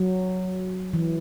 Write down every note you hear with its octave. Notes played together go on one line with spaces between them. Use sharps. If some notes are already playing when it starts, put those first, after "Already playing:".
Already playing: F#3
E3